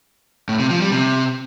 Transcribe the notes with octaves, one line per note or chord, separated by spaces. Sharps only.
A2
C3
F3
G3
C3